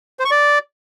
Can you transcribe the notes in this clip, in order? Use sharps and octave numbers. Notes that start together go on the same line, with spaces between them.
C5
C#6
D5